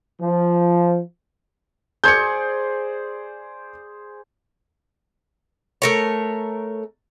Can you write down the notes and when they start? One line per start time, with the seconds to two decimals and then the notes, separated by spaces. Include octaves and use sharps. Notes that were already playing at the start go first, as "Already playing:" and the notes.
0.20 F3
2.04 G#4 C5 D5 G6 G#6 C#7
5.82 A3 A#4 C#5